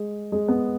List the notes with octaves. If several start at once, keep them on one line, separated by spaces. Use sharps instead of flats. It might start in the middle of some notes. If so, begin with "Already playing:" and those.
Already playing: G#3
G#3
B3